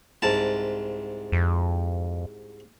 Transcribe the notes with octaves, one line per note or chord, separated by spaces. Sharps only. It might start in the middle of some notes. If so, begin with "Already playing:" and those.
C2 G#2 A5
F2